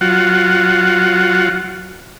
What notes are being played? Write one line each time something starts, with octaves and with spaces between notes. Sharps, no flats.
F#3 F4 F#5